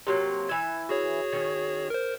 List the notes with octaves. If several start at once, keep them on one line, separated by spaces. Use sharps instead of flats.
C3 F#3 A#3
E3 E5 G#6
F#4 G#4 C#5
D#3 C#4
A#4 C5